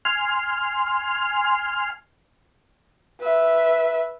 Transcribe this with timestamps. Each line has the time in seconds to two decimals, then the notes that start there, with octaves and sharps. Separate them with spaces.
0.05 G#5 C6 F6
3.21 B4 E5